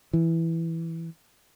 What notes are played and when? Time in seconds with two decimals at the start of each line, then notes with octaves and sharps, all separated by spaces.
0.13 E3